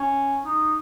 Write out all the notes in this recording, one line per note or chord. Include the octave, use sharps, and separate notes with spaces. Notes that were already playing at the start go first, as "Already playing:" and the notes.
Already playing: C#4
D#4